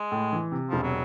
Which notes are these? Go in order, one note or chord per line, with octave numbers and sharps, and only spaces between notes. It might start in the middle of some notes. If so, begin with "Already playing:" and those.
Already playing: G#3
A2
E3
C3
E1 F3
F#3